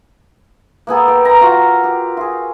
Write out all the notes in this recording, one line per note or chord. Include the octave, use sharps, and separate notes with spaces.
A#3 B3 G#4 A4
B4 G5
A#5 B5
F4 F#4 A#4 F5
G4
F4 G#4